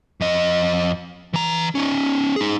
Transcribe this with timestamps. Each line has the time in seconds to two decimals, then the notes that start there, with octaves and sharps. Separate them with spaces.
0.21 F2 D#5
1.33 E3 A#5
1.75 C#4 D#4
2.36 D#4 G#4